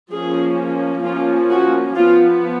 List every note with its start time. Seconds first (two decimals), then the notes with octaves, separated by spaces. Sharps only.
0.12 F3 A#3 C#4 G#4
1.05 F3 A#3 C#4 F4
1.51 F#4
1.97 F3 B3 F4